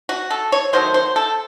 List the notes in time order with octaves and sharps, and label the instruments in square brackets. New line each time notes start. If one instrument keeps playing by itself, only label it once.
[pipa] F#4
A4
C#5
D#3 F#3 A3 C5
C5
A4